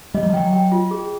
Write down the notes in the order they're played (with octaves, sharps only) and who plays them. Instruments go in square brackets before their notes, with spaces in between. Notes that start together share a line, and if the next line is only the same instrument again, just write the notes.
[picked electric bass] G3 [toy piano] D#5
[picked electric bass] F#3
F3
[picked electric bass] F#3 [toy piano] G5
[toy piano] G5
F4
G#4